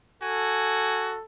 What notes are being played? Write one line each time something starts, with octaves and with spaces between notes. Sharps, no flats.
F#4 A4 G#5